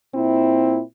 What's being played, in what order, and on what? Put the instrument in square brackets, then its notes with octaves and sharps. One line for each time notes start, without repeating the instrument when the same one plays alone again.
[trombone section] A#2 C4 E4